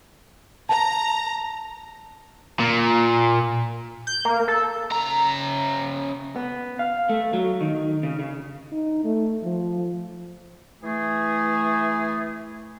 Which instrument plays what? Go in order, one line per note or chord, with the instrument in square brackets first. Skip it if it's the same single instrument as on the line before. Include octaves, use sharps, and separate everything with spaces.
[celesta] A5 [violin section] A#5
[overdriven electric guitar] A#2
[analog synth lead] G6
A#3
A4
[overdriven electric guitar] C#3 A#5
[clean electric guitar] B3
F5
A3
F#3
D#3
C#3
C#3
[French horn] D#4
A3
F3
[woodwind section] E3 A3 G#4